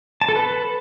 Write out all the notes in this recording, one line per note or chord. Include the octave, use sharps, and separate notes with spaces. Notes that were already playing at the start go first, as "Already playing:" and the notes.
A5
A4
B4